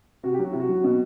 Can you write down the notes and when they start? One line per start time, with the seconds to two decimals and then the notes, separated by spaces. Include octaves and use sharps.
0.23 C3 F#4
0.34 G4
0.39 F#3
0.44 F#4
0.52 C3 E4
0.60 F#4
0.69 F#3
0.84 B2